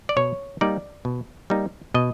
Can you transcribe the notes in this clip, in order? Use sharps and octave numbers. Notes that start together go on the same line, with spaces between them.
D5
B2 C#5
G3 A#3 D#4 D5
B2
G3 A#3 D#4
B2 D#5